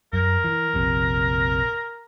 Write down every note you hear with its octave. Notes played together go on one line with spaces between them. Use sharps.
F#2 A#4
E3
F1 A#1 C3